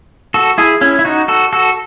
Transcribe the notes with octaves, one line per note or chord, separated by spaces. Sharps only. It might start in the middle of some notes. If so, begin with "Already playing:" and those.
F#4 A4
E4 G#4
C#4 E4
E4
D#4 F#4
F#4 A4
F#4 A4